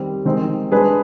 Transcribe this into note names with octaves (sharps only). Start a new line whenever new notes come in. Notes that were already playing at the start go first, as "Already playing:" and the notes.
Already playing: D#3 G3 C4 G4
D#3 G#3 C4 D#4
G#3 D4 G#4 B4